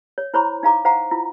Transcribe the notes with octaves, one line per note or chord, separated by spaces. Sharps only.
C#5
E4 C5 C#5 A#5 B5 C#6
D#4 F5 A#5 D6
C5 F5 F#5 A#5
E4 F4